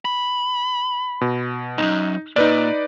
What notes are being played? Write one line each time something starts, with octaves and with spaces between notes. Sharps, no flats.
B5
B2
B1 F#2 D#4
A#2 D#4 B4 D5